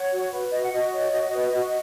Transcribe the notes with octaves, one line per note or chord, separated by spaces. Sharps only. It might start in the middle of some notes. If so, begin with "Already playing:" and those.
Already playing: C#5 F#5
F#4
B4
F#4 D#5
F#5
F#4 D#5
C#5
F#4
B4
F#4